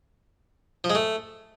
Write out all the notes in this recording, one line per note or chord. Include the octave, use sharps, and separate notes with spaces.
F3
G#3
A3